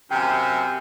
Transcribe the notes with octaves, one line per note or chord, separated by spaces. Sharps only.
F#2 C3 G5 G#5